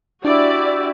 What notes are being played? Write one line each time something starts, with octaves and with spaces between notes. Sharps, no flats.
D4 E4 F#4 G4 D5